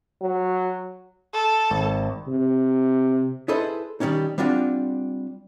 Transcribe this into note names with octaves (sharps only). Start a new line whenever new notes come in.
F#3
A4
G#1
C3
E4 G#4 A4 B4 C5 D#5
D#3 G3 A3 C#4 D#4
G3 C4 D4 F4 F#4